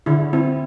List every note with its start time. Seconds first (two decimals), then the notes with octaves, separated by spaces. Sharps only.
0.06 D3 E4
0.33 C4 E4